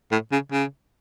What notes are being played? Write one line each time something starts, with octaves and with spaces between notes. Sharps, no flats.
A2
C#3
C#3